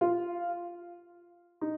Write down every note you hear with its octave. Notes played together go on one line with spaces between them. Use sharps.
F4
D#4